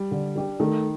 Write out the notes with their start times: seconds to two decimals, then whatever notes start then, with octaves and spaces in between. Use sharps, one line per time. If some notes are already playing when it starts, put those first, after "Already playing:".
Already playing: G3
0.11 D3
0.35 G3 D4 G4 D5
0.60 D#3 A3